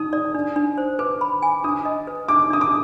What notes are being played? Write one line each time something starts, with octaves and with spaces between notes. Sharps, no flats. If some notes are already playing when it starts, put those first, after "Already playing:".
Already playing: D#4 D#6
D5
D4
D4
C5
B4 D6
B5
G#5
D4 D#6
D#5
B4
D4 D6
D4 D#6
D6